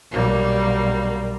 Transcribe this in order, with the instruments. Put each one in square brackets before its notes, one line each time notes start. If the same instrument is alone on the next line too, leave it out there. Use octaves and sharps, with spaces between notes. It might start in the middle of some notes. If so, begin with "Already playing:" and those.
[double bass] B1 G3 [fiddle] A#3